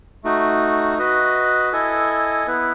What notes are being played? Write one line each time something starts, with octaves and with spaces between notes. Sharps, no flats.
A3 D#4 F#4
F#4 B4 D#5
E4 A4 D#5 G#5
B3 E4 B4